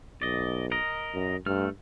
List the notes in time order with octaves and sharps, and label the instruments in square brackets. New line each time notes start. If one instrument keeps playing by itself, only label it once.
[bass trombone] B1 [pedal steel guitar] D5 D#5
[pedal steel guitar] A#4 D#5
[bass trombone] F#2
[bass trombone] G2 [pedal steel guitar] A3 F6